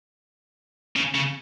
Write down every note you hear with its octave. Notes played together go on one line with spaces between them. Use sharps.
C#3
C#3